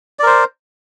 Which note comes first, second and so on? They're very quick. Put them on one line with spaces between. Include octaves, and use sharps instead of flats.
D5 A#4 C5